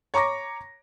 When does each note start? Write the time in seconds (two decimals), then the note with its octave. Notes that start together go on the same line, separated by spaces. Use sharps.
0.14 C#5 A#5 C#6 D6 A#6